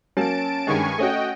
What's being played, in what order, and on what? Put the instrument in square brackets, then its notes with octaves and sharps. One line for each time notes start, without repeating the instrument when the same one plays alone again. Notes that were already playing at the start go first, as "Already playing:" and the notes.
[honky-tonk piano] F#3 A#3 [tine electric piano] C#4 [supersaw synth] A5 D7
[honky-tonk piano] G2 D#3 G#3 [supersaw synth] G#5 C#6
[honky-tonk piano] A3 C#4 F#4 [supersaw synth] D#5 G5